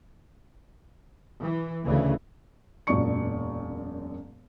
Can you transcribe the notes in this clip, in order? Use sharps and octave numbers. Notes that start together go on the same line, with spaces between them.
E3
D2 C#3 E3
E1 F#2 A#2 D5 C#6 C#7